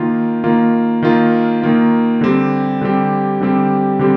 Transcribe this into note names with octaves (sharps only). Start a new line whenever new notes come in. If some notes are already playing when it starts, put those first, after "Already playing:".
Already playing: D#3 A#3 F4
D#3 A#3 F4
D#3 A#3 F4
D#3 A#3 F4
D3 G3 C4 G4
D3 G3 C4 G4
D3 G3 C4 G4
D3 G3 C4 G4